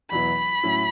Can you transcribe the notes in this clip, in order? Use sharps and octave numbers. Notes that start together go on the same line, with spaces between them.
E2 B2 F#3 B3 E4 B5
A2 F#3 C#4 E4